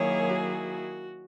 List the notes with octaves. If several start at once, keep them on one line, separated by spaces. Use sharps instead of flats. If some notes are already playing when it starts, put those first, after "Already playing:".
Already playing: D#3 F#3 A#3 E4 G#4 C#5
F#4